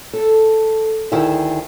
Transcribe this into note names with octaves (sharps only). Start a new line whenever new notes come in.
A4
D2 D#3 E4 G#4 E5